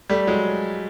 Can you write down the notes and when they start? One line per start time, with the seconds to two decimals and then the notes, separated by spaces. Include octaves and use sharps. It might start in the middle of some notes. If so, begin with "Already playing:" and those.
0.10 G3 A3
0.27 F#3 G#3